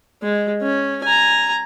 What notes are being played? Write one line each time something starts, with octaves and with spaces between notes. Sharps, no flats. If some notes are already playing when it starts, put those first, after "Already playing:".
G#3
C#4
G#5 A#5